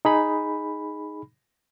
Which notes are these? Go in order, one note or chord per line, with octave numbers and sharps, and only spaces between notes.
D#4 G#4 B5